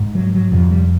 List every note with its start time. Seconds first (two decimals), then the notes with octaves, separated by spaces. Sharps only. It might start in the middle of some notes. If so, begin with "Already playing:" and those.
Already playing: G#2
0.15 F#3
0.34 F#3
0.52 F2 C3 F3
0.70 G3